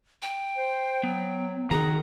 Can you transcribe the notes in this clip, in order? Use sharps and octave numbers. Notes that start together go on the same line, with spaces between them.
G5
C5
F#3 B3
D#3 E3 F#4 G#4 A#5